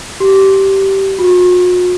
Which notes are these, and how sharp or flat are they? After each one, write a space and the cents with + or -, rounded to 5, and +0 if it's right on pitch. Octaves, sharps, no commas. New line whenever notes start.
G4 -15
F#4 -45